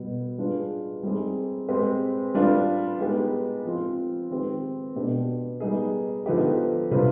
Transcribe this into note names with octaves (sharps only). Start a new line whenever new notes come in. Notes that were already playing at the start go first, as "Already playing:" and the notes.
Already playing: B2 G3 B3
G3 D4 F4 G#4 B4
G3 C4 D#4 G#4
G#3 C4 G4 B4
G3 D4 F4 B4
G#3 B3 D#4 G4
F3 C4 F4
D#3 G#3 C4 G4 B4
B2 B3 D4 G4 B4
G3 B3 D#4 G#4
D3 F3 B3 D#4 G4
C3 G3 D4 F4 B4